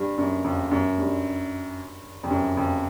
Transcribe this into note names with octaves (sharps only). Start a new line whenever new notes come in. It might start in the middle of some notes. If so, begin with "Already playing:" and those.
Already playing: G2
F#2
F2
F#2
G2
F2
F#2
F2